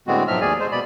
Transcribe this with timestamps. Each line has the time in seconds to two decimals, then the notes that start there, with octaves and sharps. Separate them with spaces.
0.07 A2 D3 G#3 B3 C4 F#4
0.28 G#2 B2 F3 F#3 E5 F6
0.41 D#2 G#4 D5 G#5
0.59 G#3 C5
0.72 B2 D5 B5